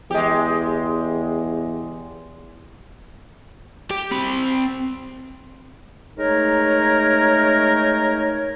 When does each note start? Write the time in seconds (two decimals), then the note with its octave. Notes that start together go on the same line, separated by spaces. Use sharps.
0.11 E2 G#3 G4
3.91 G4
4.11 C4 B5
6.18 G#3 A3 D#4 A#4 C#5